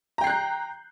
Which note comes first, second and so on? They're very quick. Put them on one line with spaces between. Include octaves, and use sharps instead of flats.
A#5 G5 C7 F#6 G6